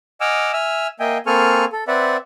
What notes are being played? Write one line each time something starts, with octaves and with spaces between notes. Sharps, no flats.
D#5 F#5 G#5 D6 E6 F6
E5 G#5 E6 F6
A#3 D#5 E5 G5 G#5
A#3 C4 A4 G#5 C#6 F6
A4
C4 B4 D5 E5 F#5